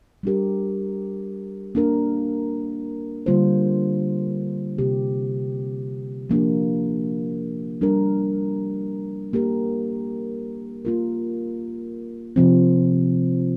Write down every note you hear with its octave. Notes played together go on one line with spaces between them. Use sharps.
G3 D4 G4 A#4
A#3 D4 A#4
D3 G3 A#3 F4 C5
C3 A#3 G4
F3 A#3 D4 G4
G3 D4 A#4
A#3 G4 A#4
A#3 F4 A#4
C3 F3 C4